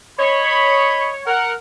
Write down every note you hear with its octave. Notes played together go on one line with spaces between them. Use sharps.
C#5 D#5 B5
A#4 F#5